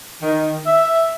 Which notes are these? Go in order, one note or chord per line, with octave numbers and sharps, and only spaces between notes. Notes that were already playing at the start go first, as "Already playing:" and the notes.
D#3
E5